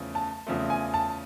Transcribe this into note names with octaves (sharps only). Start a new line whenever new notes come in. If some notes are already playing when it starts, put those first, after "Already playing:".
Already playing: E2 C#3 F3 A3
A5
E2 C#3 F3 A3
G#5
A5